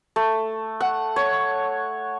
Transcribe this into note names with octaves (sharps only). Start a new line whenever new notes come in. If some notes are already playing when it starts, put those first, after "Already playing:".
A3
F#5
C#5